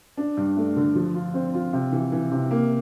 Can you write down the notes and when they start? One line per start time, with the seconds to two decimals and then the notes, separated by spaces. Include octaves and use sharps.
0.17 D4
0.37 G2
0.57 A3
0.76 D3
0.95 F3
1.14 F4
1.34 C4
1.54 F4
1.73 C3
1.92 E3
2.12 E3
2.31 C3
2.51 A#3